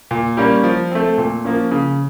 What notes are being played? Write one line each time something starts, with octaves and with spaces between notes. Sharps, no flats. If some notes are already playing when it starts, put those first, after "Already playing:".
A#2
G3 A#3 C#4
F3
A3 C4
A#2
F3 A#3 C#4
C#3